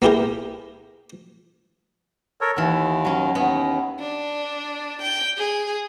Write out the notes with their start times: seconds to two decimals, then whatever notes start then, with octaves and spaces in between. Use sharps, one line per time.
0.02 A#3 B3 E4 G4 G#4 A#4
2.41 A4 A#4 C#5
2.56 D#2 E3 B3
3.05 F#3 C#4
3.35 D#2 B3 E4 D#5
4.00 D4
5.02 G5
5.37 G#4